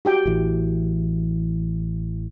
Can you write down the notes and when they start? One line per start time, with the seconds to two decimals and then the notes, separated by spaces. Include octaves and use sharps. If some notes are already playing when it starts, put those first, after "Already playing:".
0.05 F#4 G4 G5
0.25 A1 E3